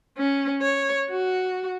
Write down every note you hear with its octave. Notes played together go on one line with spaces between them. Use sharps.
C#4
C#5
F#4